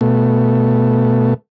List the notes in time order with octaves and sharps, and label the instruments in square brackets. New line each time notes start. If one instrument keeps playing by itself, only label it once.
[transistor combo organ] B2 A3